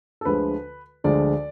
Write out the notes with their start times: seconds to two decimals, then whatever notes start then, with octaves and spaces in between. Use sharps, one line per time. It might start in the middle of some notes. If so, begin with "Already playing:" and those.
0.21 A4
0.25 D2 D3 F3 G#3 B4
1.04 D2 D3 F3 G#3 D5